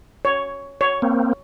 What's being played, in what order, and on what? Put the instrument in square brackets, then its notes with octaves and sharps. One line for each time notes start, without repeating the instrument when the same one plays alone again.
[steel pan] C#5
C#5
[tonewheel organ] A#3 C4